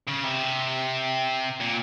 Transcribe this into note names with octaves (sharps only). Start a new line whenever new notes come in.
C#3
C3
A#2